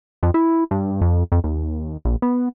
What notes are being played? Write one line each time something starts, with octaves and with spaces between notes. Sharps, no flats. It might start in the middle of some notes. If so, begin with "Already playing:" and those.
F2
E4
G2
F2
F2
D#2
A#1
B3